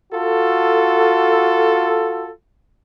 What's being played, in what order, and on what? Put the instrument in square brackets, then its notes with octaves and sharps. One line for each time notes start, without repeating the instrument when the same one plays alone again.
[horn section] F4 F#4 A4